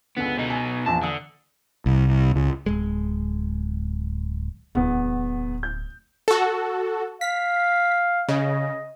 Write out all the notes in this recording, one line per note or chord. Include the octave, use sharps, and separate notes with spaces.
C#2 D3 B3
B2 D#4
G#5
A#1 E2 A5
D3 D#6
C2
C#2
D1 G#3
D1 E2 B3
G6
F#4 A4
F5 B6
C#3 D#5